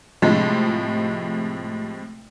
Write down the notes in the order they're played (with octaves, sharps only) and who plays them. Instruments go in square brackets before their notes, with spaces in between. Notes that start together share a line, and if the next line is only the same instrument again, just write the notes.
[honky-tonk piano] A2 C3 F3 G#3